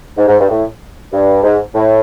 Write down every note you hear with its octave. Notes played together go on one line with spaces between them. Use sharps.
G#2
G#2
G2
A2
G2
G#2
A2